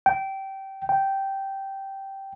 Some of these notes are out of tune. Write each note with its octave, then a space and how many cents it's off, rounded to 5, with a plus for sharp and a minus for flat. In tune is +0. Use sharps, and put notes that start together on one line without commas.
G5 -20
G5 -10